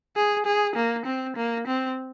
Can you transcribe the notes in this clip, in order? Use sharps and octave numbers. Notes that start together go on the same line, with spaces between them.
G#4
G#4
A#3
C4
A#3
C4